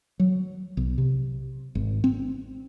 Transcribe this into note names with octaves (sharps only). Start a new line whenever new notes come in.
F#3
B1
C3
G#1
C4